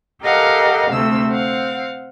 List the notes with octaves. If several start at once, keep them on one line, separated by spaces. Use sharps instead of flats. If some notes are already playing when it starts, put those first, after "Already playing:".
G4 A4 A#4 D#5 F5 F#5
D2 C3 A3 C4 E6
C4 F5 F#5